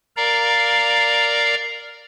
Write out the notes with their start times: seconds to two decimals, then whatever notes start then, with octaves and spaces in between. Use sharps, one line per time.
0.17 A#4 D5 F5 A#5